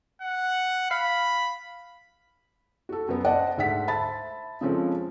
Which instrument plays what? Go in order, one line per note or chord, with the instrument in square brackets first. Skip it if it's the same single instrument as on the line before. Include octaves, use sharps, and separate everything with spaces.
[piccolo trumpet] F#5
[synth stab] F5 [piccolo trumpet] B5
[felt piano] F#4 A4
F#2 B3
C5 D5 D#5 F#5 A5
D2 G#2 E5 F#5 B6
C5 E5 A5 B5 A6
C#3 F3 G#3 C4 C#4 A4